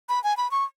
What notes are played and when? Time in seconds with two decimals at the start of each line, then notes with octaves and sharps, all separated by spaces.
0.09 B5
0.24 G#5
0.37 B5
0.51 C#6